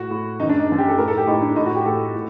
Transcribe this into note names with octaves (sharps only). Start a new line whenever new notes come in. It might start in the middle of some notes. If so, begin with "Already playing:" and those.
Already playing: A2 F#4
A2
F#2 D#3 D#4
D4
D#4
F#2 D#3
G4
A4
A2 A#4
A4
G4
A2 D#4
D4
A2 D#4
F#4
G4
A2 A4
A2